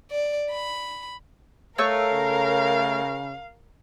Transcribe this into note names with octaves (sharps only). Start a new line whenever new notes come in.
D5
B5
A3 A#4 C#5 F5 E6
C#3